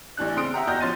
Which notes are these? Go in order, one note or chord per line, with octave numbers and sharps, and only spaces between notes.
A1 E3 D4 F#6
C#3 C4 C6 D#6 D7
E5 F#5 G5 A#5
E2 F#4 D#5 F6 G6 A#6
F3 C#4 C6 A6 D#7